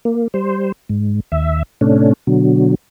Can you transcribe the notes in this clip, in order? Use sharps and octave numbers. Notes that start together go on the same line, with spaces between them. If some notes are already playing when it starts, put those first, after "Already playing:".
A#3
G3 C5
G#2
D#2 E5
A2 C3 A3 C#4 D4
B2 D3 F#3